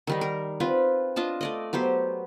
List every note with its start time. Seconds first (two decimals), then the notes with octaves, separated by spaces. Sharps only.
0.07 D#3 G3 D#4
0.21 A#4
0.60 C4 F4 B4
1.16 D4 F4 D#5 A5
1.41 A3 D5 D#5
1.73 F#3 B3 G4 C5